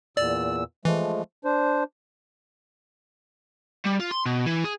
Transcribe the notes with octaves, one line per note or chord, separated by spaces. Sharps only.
E2 A#2 D5 E6
E3 F3 G#3 A3
D4 C5
G3
F4
C6
B2
E3
G#4